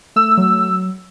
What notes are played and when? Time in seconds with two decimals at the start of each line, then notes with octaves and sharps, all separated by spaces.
0.16 A3 E6
0.37 F#3